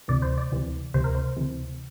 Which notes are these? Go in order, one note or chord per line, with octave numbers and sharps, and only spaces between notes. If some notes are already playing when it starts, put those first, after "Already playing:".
D2 C3 E3 D5
C5
D5
D2 C3 E3
D2 C3 E3 C5
A#4
C5
D2 C3 E3